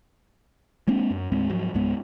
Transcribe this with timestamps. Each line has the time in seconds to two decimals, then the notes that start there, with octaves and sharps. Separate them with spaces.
0.87 G#3 A#3 C4 D4
1.11 F#2
1.32 D#2 A2 G#3 C4
1.50 G#2 F3 F#3
1.74 C#2 G#2 G#3 B3